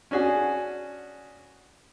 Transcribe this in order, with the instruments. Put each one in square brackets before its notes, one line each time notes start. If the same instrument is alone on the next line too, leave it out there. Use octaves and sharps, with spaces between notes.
[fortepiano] C#4 D4 F#4 G#4